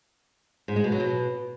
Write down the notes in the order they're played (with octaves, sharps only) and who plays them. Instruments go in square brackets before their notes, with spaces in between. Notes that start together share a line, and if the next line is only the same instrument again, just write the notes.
[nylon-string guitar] G#2
G#3
B2
F#3
B2